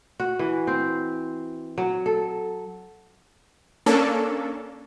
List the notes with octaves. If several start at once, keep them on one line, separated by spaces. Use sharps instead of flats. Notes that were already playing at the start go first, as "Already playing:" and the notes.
F#4
E3
C4
F#3
A4
A#3 C#4 D4 A4